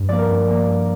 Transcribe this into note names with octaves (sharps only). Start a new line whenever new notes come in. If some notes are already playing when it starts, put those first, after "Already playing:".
Already playing: G2
F3 A#3 D5
A#4
G2
F3 A#3
G2